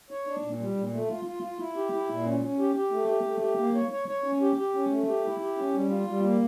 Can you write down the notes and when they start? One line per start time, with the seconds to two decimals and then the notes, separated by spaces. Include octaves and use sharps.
0.10 C#5
0.27 D4
0.42 A#2
0.60 G3
0.76 A#2
0.93 A3
1.09 F4
1.25 F4
1.43 F4
1.58 E4
1.76 G4
1.92 E4
2.09 A#2
2.26 C#4
2.43 C#4
2.59 G4
2.75 G4
2.91 A3
3.09 G4
3.26 A3
3.42 G4
3.58 A#3
3.75 C#5
3.91 C#5
4.08 C#5
4.24 C#4
4.41 G4
4.57 G4
4.74 C#4
4.91 A3
5.08 G4
5.25 E4
5.40 G4
5.57 C#4
5.74 G3
5.90 F4
6.07 G3
6.24 A#3